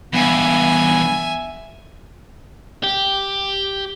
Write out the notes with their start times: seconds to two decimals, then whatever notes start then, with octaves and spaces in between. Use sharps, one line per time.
0.13 E2 G2 B3 E5 G#5
2.84 G4